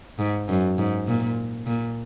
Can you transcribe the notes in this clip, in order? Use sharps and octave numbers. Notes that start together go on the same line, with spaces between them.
G#2
F#2
G#2
A#2
A#2